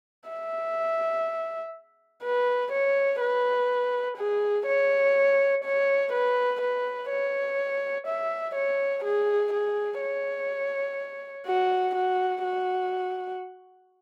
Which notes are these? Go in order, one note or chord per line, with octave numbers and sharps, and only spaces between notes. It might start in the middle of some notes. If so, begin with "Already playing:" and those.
E5
B4
C#5
B4
G#4
C#5
C#5
B4
B4
C#5
E5
C#5
G#4
G#4
C#5
F#4
F#4
F#4